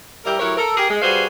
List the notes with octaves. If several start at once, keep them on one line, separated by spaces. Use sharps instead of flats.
G3 E4 G4 A#4
F#3 A3 E4 G4 A#4 C#5
A4 A#4
G4 G#4 A#4
G#3
G3 F#4 G#4 B4 C5 F5